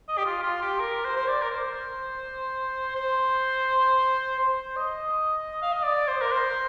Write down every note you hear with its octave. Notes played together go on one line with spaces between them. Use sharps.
D#5
G4
F4
F4
G4
A#4
C5
C5
D5
A#4
C5
C5
C5
D#5
F5
D#5
D5
C5
A#4
C5